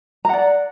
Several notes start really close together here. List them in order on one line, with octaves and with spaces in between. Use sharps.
A#5 F#5 D5